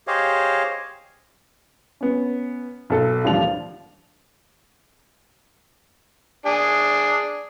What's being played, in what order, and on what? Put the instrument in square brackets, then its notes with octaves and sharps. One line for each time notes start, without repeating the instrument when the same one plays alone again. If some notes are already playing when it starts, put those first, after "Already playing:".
[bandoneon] G4 G#4 C5 C#5 D#5 F5
[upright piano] B3 C#4
B1 A4
A1 D#2 D3 F3 G3 F7
[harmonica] D4 G#4